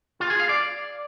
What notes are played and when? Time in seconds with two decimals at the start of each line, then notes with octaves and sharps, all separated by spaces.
0.20 F4
0.30 G#4
0.39 F5
0.49 D5